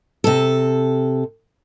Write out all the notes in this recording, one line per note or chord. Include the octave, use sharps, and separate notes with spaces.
C3 A4